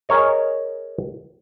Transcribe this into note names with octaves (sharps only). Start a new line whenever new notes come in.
G#4 A#4 C#5 D#5